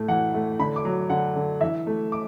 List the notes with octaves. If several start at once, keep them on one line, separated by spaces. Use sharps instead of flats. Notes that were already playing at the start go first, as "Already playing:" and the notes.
Already playing: A2 A3
E3 F#5
A3
D3 B5
D6
F#3
D3 F#5
D3
E3 E5
A3
D6